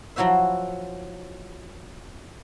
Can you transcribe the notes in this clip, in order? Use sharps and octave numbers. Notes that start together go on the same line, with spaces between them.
F3 F#3 E4 F#4 C5 E5